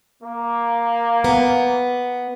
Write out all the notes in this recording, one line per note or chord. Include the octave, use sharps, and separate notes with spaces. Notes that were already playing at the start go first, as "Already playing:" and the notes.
A#3
B3